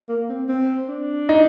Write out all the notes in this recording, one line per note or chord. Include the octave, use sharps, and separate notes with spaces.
A#3
C4
C4
D4
D#4